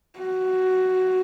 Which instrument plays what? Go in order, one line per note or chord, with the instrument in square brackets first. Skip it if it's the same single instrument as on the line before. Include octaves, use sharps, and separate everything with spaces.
[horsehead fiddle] F#4